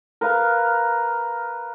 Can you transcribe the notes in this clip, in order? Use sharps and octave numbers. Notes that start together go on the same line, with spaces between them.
A#4 B4 F5